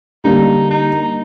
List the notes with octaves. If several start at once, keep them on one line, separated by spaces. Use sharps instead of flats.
D3 G3 A#3 D4 D#4 G4
D#4